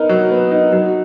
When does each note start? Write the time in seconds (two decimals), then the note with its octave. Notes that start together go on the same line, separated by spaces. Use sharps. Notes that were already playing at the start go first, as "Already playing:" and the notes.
Already playing: B3 D#4 A#4
0.09 F#3
0.31 B3
0.51 D#4
0.72 F#3